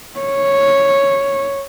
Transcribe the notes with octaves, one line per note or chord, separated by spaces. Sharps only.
C#5